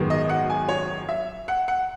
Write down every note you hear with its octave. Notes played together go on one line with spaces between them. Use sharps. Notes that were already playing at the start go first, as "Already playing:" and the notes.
Already playing: G#1 F#2 D#3 G#3 B3
D#5
F#5
G#5
C#5
E5
F#5
F#5